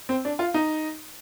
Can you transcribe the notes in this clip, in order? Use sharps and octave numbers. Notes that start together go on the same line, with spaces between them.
C4
D4
F4
D#4